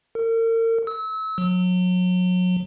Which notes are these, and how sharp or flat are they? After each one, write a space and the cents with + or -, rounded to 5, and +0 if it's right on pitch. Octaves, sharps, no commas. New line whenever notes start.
A#4 -40
E6 -30
F#3 -30